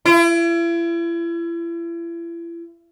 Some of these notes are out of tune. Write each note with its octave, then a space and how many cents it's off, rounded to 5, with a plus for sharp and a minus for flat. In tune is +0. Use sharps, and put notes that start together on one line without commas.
E4 +40